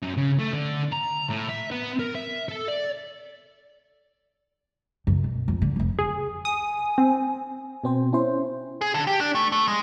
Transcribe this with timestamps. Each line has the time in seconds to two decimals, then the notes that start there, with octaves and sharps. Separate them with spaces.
0.02 F#2
0.17 C#3
0.39 A3
0.53 D3
0.93 A#5
1.30 A2
1.49 E5
1.71 B3
1.99 A#4
2.15 E5
2.49 A4
2.68 D5
5.07 F#2 C#3
5.24 B2
5.48 F2
5.62 D3
5.76 F1 F3
5.99 G#4
6.45 G#5 D#6
6.98 C4
7.84 B2 C4 C5
8.13 C#4 E4 C5
8.81 G#4
8.94 D3
9.07 G4
9.20 D4
9.35 A3
9.52 A3
9.68 G#3